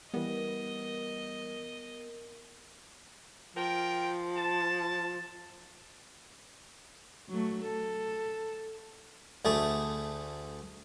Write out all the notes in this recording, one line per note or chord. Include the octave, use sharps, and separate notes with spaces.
E3 G3 B3 A#4 D#5
F3 A#4 G5
A5
F#3 A3
A4
D2 A3 G#4 A5